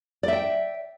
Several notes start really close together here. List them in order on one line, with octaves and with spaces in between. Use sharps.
D5 E5 G5